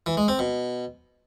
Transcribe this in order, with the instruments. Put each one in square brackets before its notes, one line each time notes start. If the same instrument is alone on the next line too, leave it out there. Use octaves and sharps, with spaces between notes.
[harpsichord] E3
G#3
C4
B2